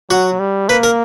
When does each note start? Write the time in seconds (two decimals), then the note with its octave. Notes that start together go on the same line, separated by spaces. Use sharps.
0.10 F#3 F#4
0.40 G3
0.69 A#3 B4
0.83 A#4